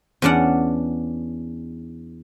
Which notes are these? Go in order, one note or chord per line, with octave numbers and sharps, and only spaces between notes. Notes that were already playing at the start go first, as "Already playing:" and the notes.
E2 C#4 D4 D5 F#5